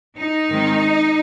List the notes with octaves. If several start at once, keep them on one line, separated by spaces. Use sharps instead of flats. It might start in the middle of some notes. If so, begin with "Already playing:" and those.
D#4
G#2 D#3 G#3 C4